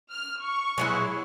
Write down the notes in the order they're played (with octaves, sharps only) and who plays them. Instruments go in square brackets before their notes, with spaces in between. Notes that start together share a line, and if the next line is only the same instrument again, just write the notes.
[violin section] F6
C#6
[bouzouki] F#3 G#3 E4